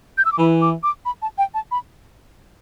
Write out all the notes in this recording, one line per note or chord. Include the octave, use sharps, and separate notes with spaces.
G6
E6
D6
E3 B5
D6
D6
B5
A5
G5
A5
B5